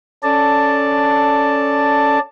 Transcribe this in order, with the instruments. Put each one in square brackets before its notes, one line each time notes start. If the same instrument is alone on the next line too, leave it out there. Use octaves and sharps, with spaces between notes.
[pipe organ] C#4 A4 D5 A5